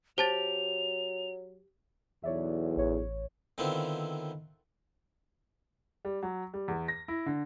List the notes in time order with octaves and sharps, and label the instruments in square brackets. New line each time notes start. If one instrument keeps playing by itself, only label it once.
[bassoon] F#3 [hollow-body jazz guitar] G4 [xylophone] C5 A5 A6 [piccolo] F7
[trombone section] B1 E2 [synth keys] C#5 D5 E5
[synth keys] A1 C#5
[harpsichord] D3 D#3 B3 C4 E4 F4
[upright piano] G3
F#3
G3
E2
A#6
E4
D3